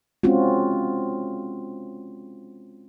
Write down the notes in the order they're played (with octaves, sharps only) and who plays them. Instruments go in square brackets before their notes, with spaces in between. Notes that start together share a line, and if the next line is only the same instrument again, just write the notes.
[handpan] G#3 C4 C#4 F4 F#4